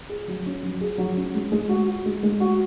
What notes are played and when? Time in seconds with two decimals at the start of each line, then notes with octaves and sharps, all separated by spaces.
0.09 G#4
0.28 F#3
0.46 C#4
0.63 F#3
0.81 G#4
0.98 F#3
1.17 C#4
1.34 G#3
1.52 G#3
1.69 F#4
1.87 F#4
2.06 G#3
2.23 G#3
2.40 F#4